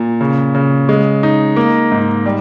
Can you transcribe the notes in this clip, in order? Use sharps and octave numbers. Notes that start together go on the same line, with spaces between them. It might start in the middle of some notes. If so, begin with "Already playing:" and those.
Already playing: A#2
C#3
C#3
G#3
D#4
A#3
G#2
G3